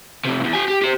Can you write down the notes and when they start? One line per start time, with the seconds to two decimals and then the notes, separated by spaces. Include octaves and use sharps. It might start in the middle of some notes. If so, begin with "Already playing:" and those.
0.25 F2 C3
0.41 E2 G#2
0.53 G4 G#5
0.68 G4
0.82 G4 C5